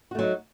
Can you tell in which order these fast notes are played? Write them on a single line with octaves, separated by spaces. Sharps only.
F#4 A3 F#3 D#4